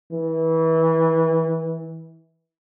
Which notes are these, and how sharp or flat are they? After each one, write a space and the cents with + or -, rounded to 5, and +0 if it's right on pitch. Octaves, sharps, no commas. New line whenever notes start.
E3 -25